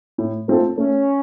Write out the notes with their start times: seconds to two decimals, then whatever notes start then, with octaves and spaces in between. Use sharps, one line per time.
0.18 A2
0.48 A3 C4 F4 A4
0.77 A3 C#4